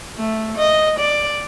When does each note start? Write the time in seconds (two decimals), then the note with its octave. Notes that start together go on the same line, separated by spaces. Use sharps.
0.18 A3
0.57 D#5
0.99 D5